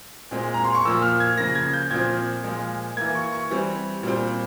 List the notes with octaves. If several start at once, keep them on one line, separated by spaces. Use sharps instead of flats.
A#2 G#3 C4
A#5
C6
C#6
A#2 F3 A#3 E6
F6
G#6
C#3 F3 A#3 A#6
A#6
G#6
G6
A#2 F3 C4 G#6
A#2 F3 G#3
E3 A#3 G#6
C#6
C#6
E3 G3 C4
A#2 G3 C4